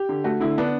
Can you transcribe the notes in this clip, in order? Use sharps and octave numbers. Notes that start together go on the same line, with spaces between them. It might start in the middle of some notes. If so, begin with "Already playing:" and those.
Already playing: G4
D3
A3 F#4
D3 E4
B3 D4